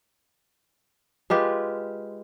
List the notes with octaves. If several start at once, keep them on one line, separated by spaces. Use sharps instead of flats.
G#3 F4 G4 B4